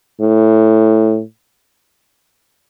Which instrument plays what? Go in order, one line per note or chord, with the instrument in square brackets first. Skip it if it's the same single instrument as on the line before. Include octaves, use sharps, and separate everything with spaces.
[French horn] A2